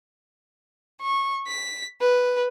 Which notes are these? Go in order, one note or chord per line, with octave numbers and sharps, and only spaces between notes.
C#6
B6
B4